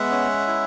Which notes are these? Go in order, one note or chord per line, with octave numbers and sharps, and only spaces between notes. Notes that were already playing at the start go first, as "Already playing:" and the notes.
Already playing: G#3 B3 E5 F#5
C#4
E4